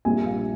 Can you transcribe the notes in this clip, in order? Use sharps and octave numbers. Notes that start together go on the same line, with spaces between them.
A#1 A#2 G3 A#3 G#5
F5